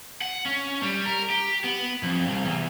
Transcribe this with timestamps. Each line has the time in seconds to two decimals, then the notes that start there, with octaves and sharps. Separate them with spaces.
0.22 F#5
0.45 C#4
0.83 G3
1.05 A#4
1.30 G4
1.64 B3
2.03 F2
2.27 C2
2.45 E2